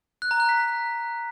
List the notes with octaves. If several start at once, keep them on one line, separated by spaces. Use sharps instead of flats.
F#6
A#5
F#6
B6